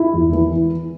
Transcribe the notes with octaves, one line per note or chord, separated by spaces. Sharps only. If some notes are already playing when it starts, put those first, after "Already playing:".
Already playing: E4
E2
E3